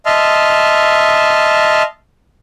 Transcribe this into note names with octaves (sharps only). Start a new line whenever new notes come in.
D#5 E5 A5 C6 F6